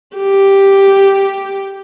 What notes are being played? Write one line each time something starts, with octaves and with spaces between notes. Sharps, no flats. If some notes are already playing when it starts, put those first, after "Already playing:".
G4